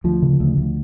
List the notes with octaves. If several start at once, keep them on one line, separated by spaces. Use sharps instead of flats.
D2 F3
C#3
D2
D2